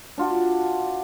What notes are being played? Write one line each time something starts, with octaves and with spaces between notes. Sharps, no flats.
D4 F4 F#4